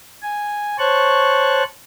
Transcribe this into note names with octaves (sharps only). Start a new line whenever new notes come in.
G#5
C5 C#5 A5 C#6 F#6